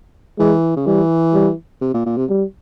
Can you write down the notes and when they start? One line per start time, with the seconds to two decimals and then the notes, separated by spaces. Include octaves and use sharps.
0.39 E3 G#3
0.76 C#3
0.86 E3 G3
1.34 G3
1.81 C3
1.94 A#2
2.06 A#2
2.17 C3
2.29 G3